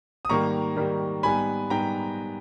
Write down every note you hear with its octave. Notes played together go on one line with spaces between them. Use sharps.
D#6
G#2 D#3 G3 A#3 A#5 C#6
G#2 D#3 G3 A#3
G#2 G3 B3 G#5 B5
G#2 G3 B3 G5 A#5